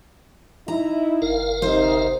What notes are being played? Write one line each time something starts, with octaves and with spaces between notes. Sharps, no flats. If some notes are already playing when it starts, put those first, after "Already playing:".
D#4 E4 A#5
G1 A#4 F5
C3 D#4 C5